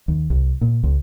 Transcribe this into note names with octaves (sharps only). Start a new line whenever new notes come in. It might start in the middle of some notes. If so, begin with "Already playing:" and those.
D#2
C2
A#2
C#2